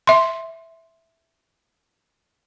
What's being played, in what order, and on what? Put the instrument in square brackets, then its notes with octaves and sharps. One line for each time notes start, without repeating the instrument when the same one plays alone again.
[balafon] E5 C6